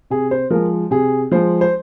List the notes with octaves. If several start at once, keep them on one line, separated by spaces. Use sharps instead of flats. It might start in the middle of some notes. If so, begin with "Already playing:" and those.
C3 G#4
C5
F3 G#3 A#4
C3 G#4
F3 G#3 C5
C5